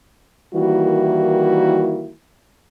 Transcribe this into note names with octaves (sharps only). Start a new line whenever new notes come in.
D#3 E3 G3 A#3 E4 F#4